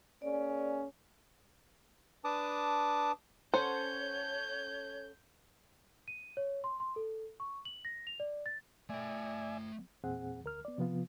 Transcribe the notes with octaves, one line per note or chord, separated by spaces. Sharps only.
A#3 C#4 G#4 D5
D4 B4 A5 D6 D#6
C#4 A4 C5 C#5 F#5 G6
D#7
C#5
C6
C6
A4
C#6
F#7
A#6
F7
D5
A6
A3 D5 E5 G5 G#5
E2 A#2 C4 G#4 F#5
D2 A#4 F6
B3 D5
C3 F3 B3 F4